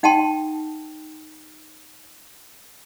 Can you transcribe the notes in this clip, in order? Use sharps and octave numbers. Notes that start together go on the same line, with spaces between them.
D#4 F#5 G5 A5 C6